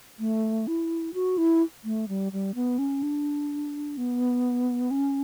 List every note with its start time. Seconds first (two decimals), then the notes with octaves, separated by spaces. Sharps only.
0.19 A3
0.67 E4
1.14 F#4
1.38 E4
1.84 A3
2.09 G3
2.32 G3
2.55 B3
2.79 C#4
3.03 D4
3.97 B3
4.91 C#4